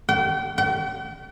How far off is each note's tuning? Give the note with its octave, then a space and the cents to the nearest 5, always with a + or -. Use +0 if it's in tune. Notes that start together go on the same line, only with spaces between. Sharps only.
G5 -35
G5 -40